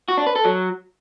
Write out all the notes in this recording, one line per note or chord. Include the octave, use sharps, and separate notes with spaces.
F#4
D4
B4
A4
F#3